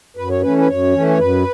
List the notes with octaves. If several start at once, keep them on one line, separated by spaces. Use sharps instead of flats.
F#2 B4
C#5
E3 A3 C#4 B4
B4
F#2 C#5
E3 A3 C#4
C#5
F#2 B4